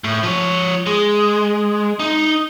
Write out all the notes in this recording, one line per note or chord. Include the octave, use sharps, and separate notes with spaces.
A2
F3 C#5
G#3
D#4